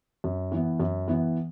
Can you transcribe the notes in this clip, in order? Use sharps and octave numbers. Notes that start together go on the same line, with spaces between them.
F#2
E3 B3
F#2
E3 B3